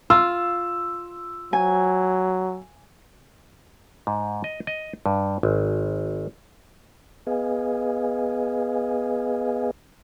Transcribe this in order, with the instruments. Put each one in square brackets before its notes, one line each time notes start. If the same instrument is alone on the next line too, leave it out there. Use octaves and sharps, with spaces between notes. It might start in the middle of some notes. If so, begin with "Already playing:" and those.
[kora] F4 [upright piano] E6
[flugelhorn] F#3 [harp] G#5
[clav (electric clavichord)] G#2
D#5
D#5
G2
G#1
[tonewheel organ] B3 G#4 B4 D#5 F5 G#5